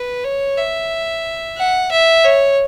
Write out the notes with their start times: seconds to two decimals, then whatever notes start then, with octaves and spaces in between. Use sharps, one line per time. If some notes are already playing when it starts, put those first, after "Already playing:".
Already playing: B4
0.24 C#5
0.58 E5
1.57 F#5
1.91 E5
2.25 C#5